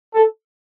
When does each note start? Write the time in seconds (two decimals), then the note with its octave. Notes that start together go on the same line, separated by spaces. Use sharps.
0.14 A4